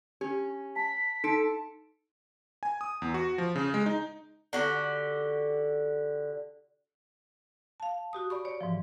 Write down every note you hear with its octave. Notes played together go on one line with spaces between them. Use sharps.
C#4 G4
A5 B6
D#4 A4 C6 D7
G#5
D#6
E2
F#4
F3
C#3
G#3
D#4
D3 F#4 G4
F5 A5
F#4 G4 D#6
D5 B5 C#6
C#5 D5
G#2 E3 F3